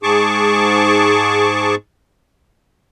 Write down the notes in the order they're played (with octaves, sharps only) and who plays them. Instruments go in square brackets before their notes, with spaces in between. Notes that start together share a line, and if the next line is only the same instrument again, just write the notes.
[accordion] G#2 G#4 A5 C#6 D6